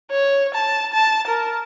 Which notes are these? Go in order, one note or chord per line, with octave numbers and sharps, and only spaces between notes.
C#5
A5
A5
A#4